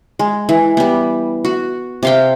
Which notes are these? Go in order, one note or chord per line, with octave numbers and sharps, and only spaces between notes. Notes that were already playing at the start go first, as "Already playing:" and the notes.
G#3
E3
G3 B3
F#4
C3 F5 G5